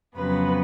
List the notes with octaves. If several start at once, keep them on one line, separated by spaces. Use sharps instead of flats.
F2 C#3 F#3 B3 B4